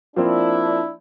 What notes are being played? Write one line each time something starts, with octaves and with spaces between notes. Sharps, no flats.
F3 A#3 C4 D4 E4